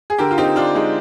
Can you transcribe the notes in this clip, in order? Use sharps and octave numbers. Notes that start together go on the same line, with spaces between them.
G#4
D3 G4 A#4
F4
C4 D#4 G4
D3 D4 F4
G#3 D#4